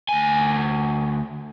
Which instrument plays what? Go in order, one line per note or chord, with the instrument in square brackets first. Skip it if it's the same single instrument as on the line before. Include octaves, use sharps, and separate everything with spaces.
[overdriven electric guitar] D2 G#5